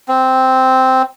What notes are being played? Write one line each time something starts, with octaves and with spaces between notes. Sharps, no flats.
C4